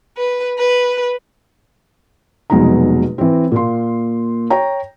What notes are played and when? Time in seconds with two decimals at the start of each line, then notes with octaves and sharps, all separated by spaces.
0.17 B4
0.58 B4
2.50 F1 B2 F#3 G#3 D#4 A#5
3.18 E3 C4
3.51 A#2 A#3 C6
4.50 C#5 G5 A#5